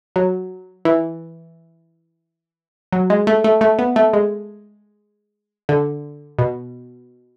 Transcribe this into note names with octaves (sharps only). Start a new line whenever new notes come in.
F#3
E3
F#3
G#3
A3
A3
A3
B3
A3
G#3
D3
B2